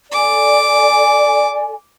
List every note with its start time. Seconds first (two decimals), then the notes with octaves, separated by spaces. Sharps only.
0.13 A4 D5 G#5 D6